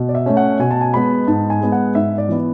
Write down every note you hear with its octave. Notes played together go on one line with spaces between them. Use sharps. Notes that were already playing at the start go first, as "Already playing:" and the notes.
Already playing: B2
D5
E5
A3 C#4
F#5
B2 G#5
A5
G#5
G#3 B3 B5
G#2 A5
G#5
G#3 B3
F#5
G#2 E5
D5
E3 B3